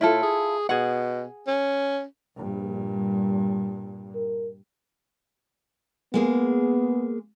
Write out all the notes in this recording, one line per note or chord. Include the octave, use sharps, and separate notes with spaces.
A2 E4 F4 A4
G#4
B2 G#4 F#5
C#4
A#1 G2 A#2
G3
A#4
G#3 A#3 B3 G#4